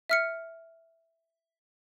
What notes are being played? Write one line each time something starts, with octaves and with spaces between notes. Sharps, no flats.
E5 F6 C#7